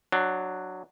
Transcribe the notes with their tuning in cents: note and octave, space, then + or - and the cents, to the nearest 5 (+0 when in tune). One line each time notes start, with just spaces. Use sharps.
F#3 +0 D4 +20